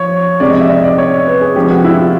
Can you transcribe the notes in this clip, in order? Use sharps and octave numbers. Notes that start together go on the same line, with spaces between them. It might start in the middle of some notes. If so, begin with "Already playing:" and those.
Already playing: F3 C#5
C3 F3 G#3 D5
D#5
E5
D#5
D5
C#5
B4
G#4
C3 F3 G#3 G4
F#4
E4
F4